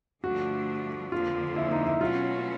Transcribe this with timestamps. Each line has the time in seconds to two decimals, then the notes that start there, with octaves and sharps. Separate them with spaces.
0.23 G2 D3 F3 A3 D4 F#4
1.12 F2 D3 F3 A#3 F4
1.56 E4
1.71 D#4
1.86 E4
2.01 B2 F#3 A3 C#4 F4 F#4